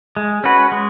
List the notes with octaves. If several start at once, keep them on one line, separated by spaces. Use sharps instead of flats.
G#3
C#4 F#4 B4
G#3